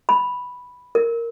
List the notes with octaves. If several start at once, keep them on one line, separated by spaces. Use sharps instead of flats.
B5
A#4